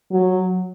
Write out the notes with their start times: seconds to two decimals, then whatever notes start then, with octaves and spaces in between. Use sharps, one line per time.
0.11 F#3